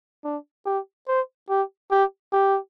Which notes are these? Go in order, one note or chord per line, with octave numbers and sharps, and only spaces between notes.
D4
G4
C5
G4
G4
G4